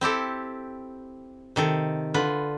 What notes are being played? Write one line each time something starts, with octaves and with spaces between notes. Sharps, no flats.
C4 E4 G4 A4
C3 D#3 A4
D3 F4 B4